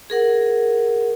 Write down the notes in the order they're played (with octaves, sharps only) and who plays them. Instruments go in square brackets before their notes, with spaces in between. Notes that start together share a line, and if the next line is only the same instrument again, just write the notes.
[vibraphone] G#4 A#4 F#5